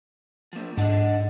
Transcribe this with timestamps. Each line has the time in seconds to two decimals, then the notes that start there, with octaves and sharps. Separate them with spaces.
0.53 F3 A#3
0.77 G#2 D4 D#5 F#5 A5